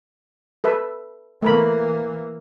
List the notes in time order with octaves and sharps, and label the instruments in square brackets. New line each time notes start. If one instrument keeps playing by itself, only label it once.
[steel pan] A4 B4 E5
[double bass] E3 A#3 [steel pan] A3 A#4 B5